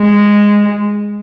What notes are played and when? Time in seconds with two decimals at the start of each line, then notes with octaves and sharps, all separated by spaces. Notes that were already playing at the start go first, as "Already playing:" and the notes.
Already playing: G#3